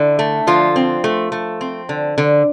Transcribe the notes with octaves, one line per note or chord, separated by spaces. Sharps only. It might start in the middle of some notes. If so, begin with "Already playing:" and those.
Already playing: D3 E4
A3
D3 F3 F4
C4
A3
A3
C4
D3
D3